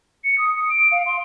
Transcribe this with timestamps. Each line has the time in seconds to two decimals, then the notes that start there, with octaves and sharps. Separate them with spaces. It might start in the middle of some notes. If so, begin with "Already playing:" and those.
0.24 C#7
0.38 D#6
0.56 D#6
0.69 D7
0.91 F5
1.06 C6